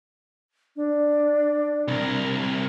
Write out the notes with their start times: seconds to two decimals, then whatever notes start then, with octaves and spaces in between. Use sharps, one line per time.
0.76 D4
1.88 C2 A#4